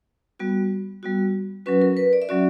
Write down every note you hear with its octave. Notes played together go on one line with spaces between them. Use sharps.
G3 B3 F#4
G3 B3 F#4
F#3 C#4 F#4 B4
A#4
B4
D5
E5
F#3 C#4 F#4 D5